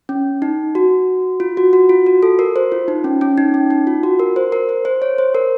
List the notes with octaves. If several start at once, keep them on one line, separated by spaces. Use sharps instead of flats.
C#4
D#4
F#4
F4
F#4
F#4
F4
F#4
A4
A#4
C5
F4
D#4
C#4
C#4
D#4
C#4
D#4
F4
F#4
A#4
C5
A#4
C5
C5
C#5
C5
A#4